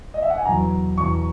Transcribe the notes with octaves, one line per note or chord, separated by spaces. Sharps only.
D#5
E5
F#5
G#5
E2 B2 F#3 A#5
E2 B2 F#3 C#6